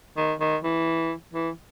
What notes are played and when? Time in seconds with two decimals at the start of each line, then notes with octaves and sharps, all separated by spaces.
0.17 D#3
0.40 D#3
0.64 E3
1.33 E3